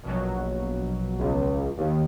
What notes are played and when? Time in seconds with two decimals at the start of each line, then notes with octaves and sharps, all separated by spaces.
0.03 A#1 B2 F#3
1.19 C#2
1.77 D#2